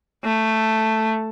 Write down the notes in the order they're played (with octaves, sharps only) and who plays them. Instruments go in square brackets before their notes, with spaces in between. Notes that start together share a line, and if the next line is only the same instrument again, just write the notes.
[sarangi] A3